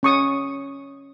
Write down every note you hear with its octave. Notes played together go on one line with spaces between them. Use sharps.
C#4 C#6 D#6